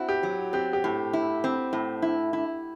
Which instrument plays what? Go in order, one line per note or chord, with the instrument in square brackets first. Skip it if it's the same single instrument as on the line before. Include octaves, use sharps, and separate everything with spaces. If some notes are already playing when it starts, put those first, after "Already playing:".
Already playing: [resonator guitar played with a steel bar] C4 E4 [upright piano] F#4
[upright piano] G4
[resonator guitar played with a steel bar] F#3
[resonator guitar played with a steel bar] C4 [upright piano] G4
[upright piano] G4
[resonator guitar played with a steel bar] A2
E4
C4
A2
E4
E4